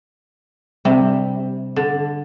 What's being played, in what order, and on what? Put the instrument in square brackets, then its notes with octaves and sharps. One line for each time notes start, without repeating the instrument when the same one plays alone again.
[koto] C3 [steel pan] G3
[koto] D3